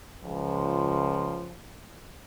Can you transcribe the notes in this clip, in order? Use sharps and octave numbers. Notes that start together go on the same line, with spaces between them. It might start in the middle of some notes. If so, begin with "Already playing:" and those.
C#2 F3